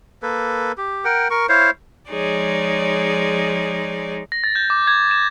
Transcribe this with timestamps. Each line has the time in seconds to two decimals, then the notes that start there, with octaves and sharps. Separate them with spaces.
0.22 A#3 A4 B4
0.78 G4
1.05 A#4 F#5 G5
1.30 A#4 C#6
1.49 E4 C5 C#5 F5
2.11 F3 G#3 D#4 G#4 C#5 D5
4.32 A#6
4.44 A6
4.55 G6
4.70 D6
4.87 G#6
5.11 E7